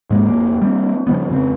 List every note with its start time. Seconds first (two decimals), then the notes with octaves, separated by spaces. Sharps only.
0.10 G#2 G#3 A#3
0.27 F1 F2 A#3
0.62 G3 A#3 C4
1.07 C#3 F3 G3 B3
1.30 F2 C#3 C4